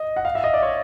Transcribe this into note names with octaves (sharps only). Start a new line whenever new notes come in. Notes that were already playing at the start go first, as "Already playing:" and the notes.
Already playing: D#5
F#5
F5
E5
D#5
D5
C#5